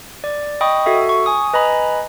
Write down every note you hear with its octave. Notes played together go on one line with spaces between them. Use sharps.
D5
D#5 G5 B5 C#6 D#6
F#4 A4 E5
C#6
G#5 D#6
B4 D#5 G#5 A#5 B5